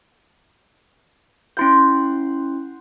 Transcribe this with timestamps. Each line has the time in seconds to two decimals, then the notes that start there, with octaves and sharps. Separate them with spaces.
1.57 C#4 E4 F#5 C6 G6